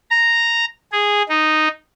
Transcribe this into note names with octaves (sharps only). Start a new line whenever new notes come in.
A#5
G#4
D#4